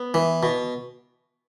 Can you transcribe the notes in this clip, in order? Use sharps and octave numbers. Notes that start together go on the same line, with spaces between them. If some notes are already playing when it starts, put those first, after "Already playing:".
Already playing: B3
E3
B2